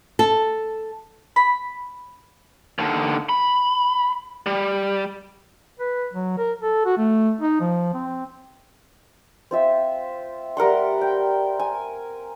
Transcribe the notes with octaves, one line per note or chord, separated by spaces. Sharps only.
A4
B5
D#2 D3
B5
G3
B4
F#3
A#4
A4
F#4
A3
D#4
F3
C4
C4 F4 E5
G3 A#4 F#5 C6
G5
G#5